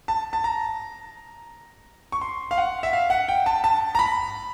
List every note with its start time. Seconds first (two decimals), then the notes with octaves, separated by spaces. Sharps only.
0.08 A5
0.33 A5
0.44 A#5
2.12 C#6
2.21 C6
2.51 F5
2.58 F#5
2.83 E5
2.93 F5
3.10 F#5
3.28 G5
3.46 A5
3.64 A5
3.95 A#5
3.99 B5